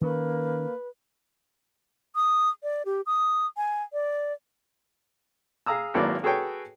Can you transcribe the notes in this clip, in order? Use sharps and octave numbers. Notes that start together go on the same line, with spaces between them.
D#3 A#3 C#4 B4
D#6
D5
G4
D#6
G#5
D5
G#4 F5 A#5 D#6 E6
G#1 F#3 A#3 E4 B4 D5
F#4 G#4 A4 B4 C#5 G5